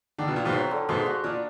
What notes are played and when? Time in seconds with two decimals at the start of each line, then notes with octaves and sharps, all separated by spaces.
0.18 D3 D#3
0.28 B2
0.36 A#2 F4
0.45 G#2 B2
0.53 F#3
0.71 D3
0.89 G#2 B2 G#3
1.06 F#4
1.24 A#2 D4